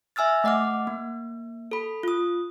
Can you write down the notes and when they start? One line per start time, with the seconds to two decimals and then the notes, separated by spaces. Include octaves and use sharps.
0.16 E5 G#5 E6 F6 A6
0.44 A3 D#5 F#5 D6 F6
0.87 A#3
1.71 A4 B5
2.03 F4 D#6